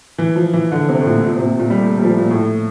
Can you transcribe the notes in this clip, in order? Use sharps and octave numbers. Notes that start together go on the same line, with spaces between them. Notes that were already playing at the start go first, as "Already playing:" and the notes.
E3
F3
E3
D3
C3
A2
A#2
A#2
C3
A#2
A#2
G3
A3
A3
G3
F3
A#2
A2